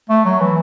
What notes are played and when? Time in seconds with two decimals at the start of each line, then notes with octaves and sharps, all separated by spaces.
0.09 A3
0.25 F#3
0.41 E3